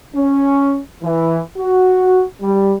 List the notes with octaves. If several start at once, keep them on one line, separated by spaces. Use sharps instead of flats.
C#4
E3
F#4
G3